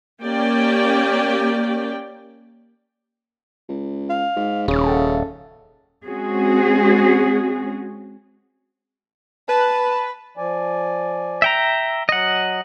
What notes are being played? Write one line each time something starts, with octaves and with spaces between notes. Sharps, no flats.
A#3 C#4 G4 D5 G5
C#2
F5
G#2
D#1 C#3
A4
G#3 C4 C#4 F#4 G#4
B4 A5
F3 D5 G#5
E5 G5 A#5
F#3 D#5 F#5